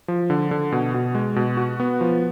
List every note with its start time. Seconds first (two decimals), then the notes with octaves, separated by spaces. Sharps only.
0.08 F3
0.30 D3
0.51 D3
0.72 B2
0.94 B2
1.15 G#3
1.36 B2
1.57 F#4
1.80 B3
2.01 F3